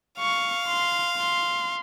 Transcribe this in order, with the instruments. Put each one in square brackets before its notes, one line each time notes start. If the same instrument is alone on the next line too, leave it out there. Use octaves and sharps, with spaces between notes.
[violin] F5 [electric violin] C#6
[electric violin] C6
C6